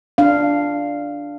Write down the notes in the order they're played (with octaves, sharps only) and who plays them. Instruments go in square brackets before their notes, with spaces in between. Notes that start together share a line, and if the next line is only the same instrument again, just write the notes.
[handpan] D4 F5